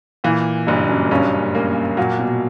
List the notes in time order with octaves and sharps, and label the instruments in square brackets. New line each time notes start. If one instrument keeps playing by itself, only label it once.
[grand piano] A#2 [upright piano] E3
[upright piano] F#1 [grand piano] G2
[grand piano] F#2
[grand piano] G2 [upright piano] C#4
[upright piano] A#3
[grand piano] A#2 [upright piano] F#3
[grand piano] B2